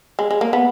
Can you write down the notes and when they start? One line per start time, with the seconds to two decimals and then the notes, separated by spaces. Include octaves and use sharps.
0.19 G#3
0.31 G#3
0.41 A#3
0.53 B3